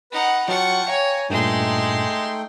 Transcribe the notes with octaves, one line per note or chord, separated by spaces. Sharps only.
D#4 B4 F#5
F#3 F4 F#5 G5 A5 C#6
C#5 F5 G5 G#5 A#5
G2 A#2 G#3 A3 D#4 G5 C6